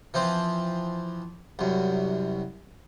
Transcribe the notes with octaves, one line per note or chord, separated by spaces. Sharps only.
E3 F3 C4
C2 F#2